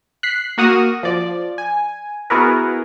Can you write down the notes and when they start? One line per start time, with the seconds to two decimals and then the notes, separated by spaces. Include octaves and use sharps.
0.23 F#6 B6 C7
0.58 A#3 F#4 D#6 F6 A#6
1.03 F3 D5
1.58 G#5
2.30 B3 E4 F#4 G#4 A#4 B4